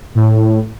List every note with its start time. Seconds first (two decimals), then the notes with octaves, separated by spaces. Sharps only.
0.15 A2